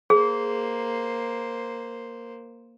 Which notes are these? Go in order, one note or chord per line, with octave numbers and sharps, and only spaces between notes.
A#3 G#4 C5